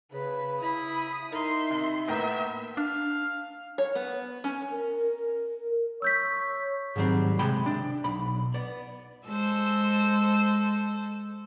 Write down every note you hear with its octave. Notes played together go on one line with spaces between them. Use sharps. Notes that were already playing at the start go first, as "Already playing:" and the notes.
C#3 B4 B5
E4 B5 D#6
D#4 A#4 E5 C6
C3
A2 A#3 B3 E5 G5
D4 F5
C#5
B3
C#4
A#4
C#5 E6 G6 B6
G#2 D#3 F#3 G3 C4
C3 G#3 E5 G5 B5
D4
B1 B5
B3 D5
G#3 A4 C5